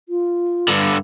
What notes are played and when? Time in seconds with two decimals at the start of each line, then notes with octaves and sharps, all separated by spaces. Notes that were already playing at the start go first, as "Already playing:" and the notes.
0.09 F4
0.68 G2 D3